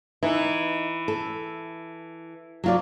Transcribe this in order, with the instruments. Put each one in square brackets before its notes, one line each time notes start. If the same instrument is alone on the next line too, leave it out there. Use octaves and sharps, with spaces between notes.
[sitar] E3 [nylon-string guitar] D#4
[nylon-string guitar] A4
F#3 F4 D5